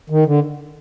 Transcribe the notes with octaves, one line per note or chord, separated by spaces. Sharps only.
D#3
D3